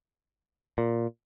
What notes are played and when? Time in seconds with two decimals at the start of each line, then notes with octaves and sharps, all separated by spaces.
0.78 A#2